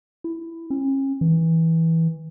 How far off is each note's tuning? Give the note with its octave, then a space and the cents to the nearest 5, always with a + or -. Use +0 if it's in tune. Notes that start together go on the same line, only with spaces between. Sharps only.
E4 +10
C#4 -35
E3 -15